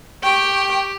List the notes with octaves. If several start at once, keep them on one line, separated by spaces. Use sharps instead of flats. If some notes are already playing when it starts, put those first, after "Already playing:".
G4 G5 C#6